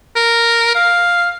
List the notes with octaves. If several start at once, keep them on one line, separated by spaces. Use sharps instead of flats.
A#4
F5